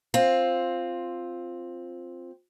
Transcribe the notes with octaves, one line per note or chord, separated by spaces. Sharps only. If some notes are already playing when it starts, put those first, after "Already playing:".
C4 F4